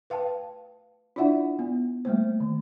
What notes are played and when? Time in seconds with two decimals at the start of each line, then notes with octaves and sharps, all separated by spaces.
0.10 B4 F5 G5 A5
1.16 D4 E4 F4 D5 E5 F#5
1.59 B3
2.05 G3 A3 A#3 C5
2.40 D#3